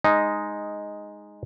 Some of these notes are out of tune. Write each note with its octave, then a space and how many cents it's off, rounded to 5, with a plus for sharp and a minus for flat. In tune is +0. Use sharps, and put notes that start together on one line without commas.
G#3 +0 D#4 +0